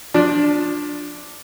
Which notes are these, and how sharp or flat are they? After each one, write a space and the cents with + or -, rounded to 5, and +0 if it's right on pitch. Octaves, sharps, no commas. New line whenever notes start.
F3 +30 D4 +0